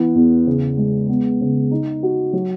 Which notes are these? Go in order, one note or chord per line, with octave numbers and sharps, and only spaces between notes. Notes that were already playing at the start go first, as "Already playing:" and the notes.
Already playing: E3 B3
E2
C#3
G#3
B3
C#3
D#4
F#4
F#3